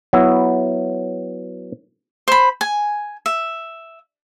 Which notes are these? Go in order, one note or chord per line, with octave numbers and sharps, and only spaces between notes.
F#3 B3 E4
C5 B5
G#5
E5